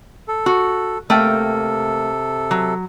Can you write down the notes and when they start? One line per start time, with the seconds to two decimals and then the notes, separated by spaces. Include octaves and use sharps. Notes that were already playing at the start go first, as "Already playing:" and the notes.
0.28 A4
0.46 F#4
1.10 C3 A3 A#3 A4 G5
2.51 F#3